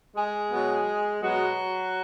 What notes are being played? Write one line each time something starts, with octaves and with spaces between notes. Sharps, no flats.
G#3 G#4
B2 F#3 B3
B2 F#3 G#3 B3 F#4